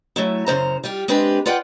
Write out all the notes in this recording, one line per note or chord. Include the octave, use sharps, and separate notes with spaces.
F#3 A3 E4
F#2 C#3 G#3 C5 A#5
G3 F4 G4
G#3 C4 D4 G4 B4
F4 B4 D5 F#5 G5